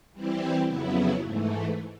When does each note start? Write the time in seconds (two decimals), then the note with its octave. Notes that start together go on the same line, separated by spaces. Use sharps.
0.13 E3 G3 C4 E4 G4
0.67 F2 C#3 F#3 B3 E4
1.21 G#2 E3 A3